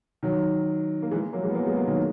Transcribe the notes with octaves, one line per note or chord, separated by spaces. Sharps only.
D#3 F#3
A#3
E3 G#3
F#3 A#3
E3 G#3
B3
F#3 A#3
G#3 B3
F#3 A#3
D#3 F#3